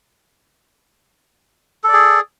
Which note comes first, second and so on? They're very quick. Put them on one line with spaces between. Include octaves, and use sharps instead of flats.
A4 D5 G#4